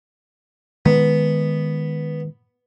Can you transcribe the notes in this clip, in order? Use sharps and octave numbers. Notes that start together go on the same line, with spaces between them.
D#3 G#3 B3